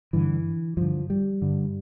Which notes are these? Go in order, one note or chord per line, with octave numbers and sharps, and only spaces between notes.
G2 D3 E3
G2 D3 F3
G3
G2 D3